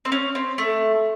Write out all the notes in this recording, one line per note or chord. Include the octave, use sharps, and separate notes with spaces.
C4
C#4
C4
A3